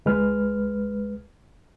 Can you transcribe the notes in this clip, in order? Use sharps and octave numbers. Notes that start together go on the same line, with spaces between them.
C#2 G#3 B4 F6